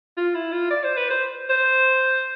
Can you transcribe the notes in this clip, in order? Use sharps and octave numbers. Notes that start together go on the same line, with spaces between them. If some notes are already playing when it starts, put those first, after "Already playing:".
F4
E4
F4
D5
C5
B4
C5
C5